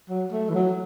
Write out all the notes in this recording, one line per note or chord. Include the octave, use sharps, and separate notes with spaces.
F#3
A3
E3
F#3